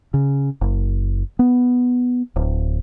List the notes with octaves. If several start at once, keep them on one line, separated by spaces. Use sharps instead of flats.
C#3
F#1
B3
D1